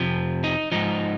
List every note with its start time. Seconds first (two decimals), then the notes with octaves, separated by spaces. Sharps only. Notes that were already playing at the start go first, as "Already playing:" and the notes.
Already playing: F2 C3 F3
0.44 D#4
0.72 G#2 F3 D#4